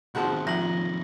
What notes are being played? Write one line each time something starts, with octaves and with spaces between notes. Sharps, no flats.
C3 D#3 F3 G#3 F#4
A1 F3 A#6 F#7